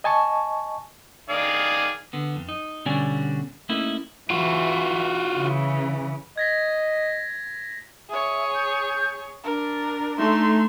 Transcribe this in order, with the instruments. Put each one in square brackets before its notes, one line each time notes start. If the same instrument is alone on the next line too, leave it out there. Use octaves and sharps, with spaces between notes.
[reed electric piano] D#5 G#5 A5 C#6
[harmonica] D#3 D5 F5 [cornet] G#4
[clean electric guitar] D3 B3
F2
D#4
B2 D3 G3 C#4 D5 G#5
A3 A#3 C#4 D#4 E4
[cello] E3 [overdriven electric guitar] F4 F#4
[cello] C#3 E3
[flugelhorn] D#5 [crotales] G#6 A#6 B6
[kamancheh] G#4 C#5 [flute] E5
[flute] G6
[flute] D4 [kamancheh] A#4
[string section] A3 [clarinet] D#4 [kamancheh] E5 C6